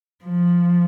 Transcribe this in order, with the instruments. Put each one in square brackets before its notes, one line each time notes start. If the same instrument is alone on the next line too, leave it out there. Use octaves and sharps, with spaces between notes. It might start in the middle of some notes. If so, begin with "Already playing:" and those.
[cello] F3